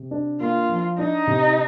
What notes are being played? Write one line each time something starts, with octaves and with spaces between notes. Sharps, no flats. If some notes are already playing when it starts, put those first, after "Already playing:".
Already playing: C3
D4
A#3 F4
F3
D4 D#4
C3